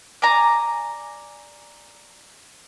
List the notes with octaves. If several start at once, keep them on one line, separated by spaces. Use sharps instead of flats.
D5 G#5 A#5